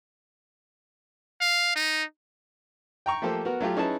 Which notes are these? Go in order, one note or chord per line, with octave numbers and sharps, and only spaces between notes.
F5
D#4
G5 A#5 C#6
F3 A3 A#3 G4 A4 C5
B3 F#4 A#4
F#3 A3 F4 G4
C#4 D#4 E4 G#4 B4 A5